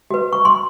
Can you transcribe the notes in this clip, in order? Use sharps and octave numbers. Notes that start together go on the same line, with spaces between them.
F#4 B4
C#6
C6